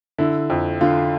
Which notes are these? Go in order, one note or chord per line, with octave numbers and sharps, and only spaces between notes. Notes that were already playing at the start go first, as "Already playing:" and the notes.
D3 E4
F2
D3 F4